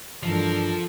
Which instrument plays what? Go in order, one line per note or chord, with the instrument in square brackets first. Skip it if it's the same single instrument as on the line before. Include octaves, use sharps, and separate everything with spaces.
[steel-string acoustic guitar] G2 E3 D#5 [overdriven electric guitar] F3 [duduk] D4 [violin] A4 A#4